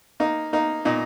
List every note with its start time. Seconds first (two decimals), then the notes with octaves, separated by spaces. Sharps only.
0.20 A#3 D#4
0.53 A#3 D#4
0.85 A#2 D#4